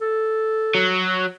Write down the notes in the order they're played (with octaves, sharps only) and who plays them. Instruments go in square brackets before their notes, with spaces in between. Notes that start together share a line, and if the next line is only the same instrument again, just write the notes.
[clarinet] A4
[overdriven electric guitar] F#3